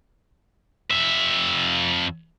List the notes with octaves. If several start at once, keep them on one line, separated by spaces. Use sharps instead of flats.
F2 E5